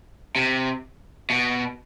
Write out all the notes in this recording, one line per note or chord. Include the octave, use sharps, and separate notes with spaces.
C3
B2